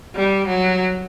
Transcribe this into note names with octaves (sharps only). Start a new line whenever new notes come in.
G3
F#3